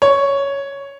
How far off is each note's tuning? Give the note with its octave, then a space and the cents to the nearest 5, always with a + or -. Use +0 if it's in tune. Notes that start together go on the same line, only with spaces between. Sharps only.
C#5 +5